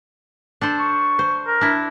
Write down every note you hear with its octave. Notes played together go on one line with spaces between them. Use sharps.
D4 A4 C5
C#6
C5
A#4
D4 E4